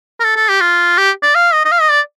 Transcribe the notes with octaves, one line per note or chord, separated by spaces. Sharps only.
A#4
A4
A4
G4
F4
G4
D5
F5
D#5
D#5
F5
D#5
D5